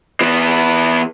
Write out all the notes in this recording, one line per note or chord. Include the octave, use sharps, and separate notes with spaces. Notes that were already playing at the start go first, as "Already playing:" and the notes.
E3 B3